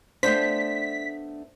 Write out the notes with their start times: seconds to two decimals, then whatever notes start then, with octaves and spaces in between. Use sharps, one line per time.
0.23 A3 B3 D4 C5 B6